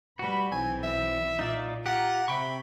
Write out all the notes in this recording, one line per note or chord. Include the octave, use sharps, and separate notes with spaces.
G3 F#4 B4 B5
B1 E3 C4 G#5
E5
A#2 D#4 F4 D5
F4 G4 F#5 A#5
C3 E5 G5 B5 C#6